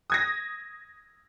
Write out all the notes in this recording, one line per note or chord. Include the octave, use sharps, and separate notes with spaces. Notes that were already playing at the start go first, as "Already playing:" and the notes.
D#6 G#6 A#6